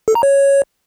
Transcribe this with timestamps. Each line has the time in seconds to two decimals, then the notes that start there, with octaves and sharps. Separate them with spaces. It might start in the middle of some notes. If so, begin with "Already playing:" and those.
0.08 A4
0.15 A#5
0.23 C#5